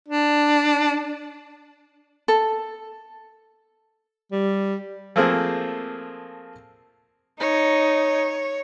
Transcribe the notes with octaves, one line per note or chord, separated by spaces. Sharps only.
D4
A4
G3
F3 A3 A#3 C4 G#4
D#4 C#5